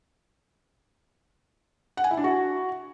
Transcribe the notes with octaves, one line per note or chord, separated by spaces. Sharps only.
F#5
G#5
E4
D4
F#4